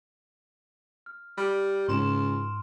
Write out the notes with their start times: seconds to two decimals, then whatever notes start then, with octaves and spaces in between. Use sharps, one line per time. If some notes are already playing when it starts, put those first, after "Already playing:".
1.06 F6
1.38 G3 F6 D7
1.89 C#2 G#2 C6 E7